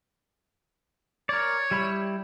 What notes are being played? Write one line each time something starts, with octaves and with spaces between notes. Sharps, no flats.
A#4 C#5 D5
G3 E4 B5